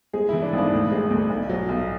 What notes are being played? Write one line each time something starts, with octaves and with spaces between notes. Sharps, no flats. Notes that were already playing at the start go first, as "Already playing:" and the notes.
G#3 G#4
E3 E4
D4
G#1 D4
D2
G#3
D2
B1
F#3
B1